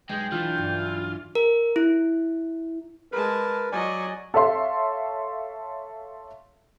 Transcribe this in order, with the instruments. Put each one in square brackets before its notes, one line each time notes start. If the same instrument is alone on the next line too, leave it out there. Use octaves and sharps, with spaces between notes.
[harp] B1 G#4 [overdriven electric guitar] G#3 [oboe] G5
[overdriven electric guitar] E3 [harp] D4 F#4 [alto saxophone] F4
[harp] G2 F#4
[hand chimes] A#4
E4
[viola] G#3 A5 [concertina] A#4 B4
[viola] F#3 D#5 [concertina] D5 G#5
[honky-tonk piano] A4 C#5 E5 F5 C6